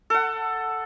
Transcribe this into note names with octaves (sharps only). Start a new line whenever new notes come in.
A4 F#5